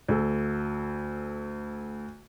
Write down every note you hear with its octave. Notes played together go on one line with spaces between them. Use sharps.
D2 A4